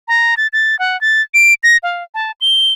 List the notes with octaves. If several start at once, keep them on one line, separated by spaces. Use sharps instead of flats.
A#5
A6
A6
F#5
A6
D7
A#6
F5
A5
G7